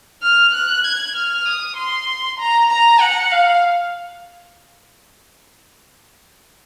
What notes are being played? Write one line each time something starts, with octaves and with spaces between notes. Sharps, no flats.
F6
F#6
G#6
F6
D#6
C6
A#5
A#5
F#5
F5